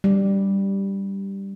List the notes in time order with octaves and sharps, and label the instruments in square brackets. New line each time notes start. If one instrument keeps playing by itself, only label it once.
[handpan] G3